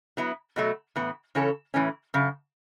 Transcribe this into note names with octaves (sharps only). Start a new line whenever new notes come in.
F#3 B3 E4
B2 F#3 A3 F#4
A2 E3 B3
C#3 E3 C#4 A4 C#5
A2 E3 A3 C#4
F#2 C#3 A4